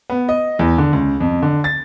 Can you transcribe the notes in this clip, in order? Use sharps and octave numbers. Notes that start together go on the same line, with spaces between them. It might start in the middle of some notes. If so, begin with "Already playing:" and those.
B3
D#5
E2
D3
C#2
F2
D3
A6